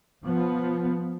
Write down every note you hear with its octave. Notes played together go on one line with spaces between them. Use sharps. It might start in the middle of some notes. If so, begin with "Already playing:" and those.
F3 B3